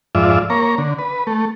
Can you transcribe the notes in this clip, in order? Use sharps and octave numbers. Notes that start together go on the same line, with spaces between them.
F2 G#2 F4 D5 E5
A#3 C#5 A#5
D3
B4
A3